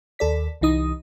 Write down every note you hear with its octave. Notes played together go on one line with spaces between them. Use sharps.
D#2 A4 D5 B6
C2 E3 D#4 D#6